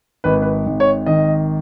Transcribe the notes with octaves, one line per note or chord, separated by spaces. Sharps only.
G#1 B4
B4
G#1
C#5
D#3 D#5